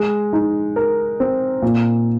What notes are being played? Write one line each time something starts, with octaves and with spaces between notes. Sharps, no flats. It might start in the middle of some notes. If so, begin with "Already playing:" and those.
Already playing: G#3
D#4
A#4
C4
A#2